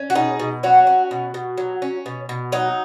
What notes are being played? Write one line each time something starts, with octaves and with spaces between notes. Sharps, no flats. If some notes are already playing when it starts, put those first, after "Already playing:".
Already playing: C#4
F#4
B2 D#4 G#4
B2
F#3 C#4 F#4
C#4
B2
B2
F#3
C#4
B2
B2
F#3 D#4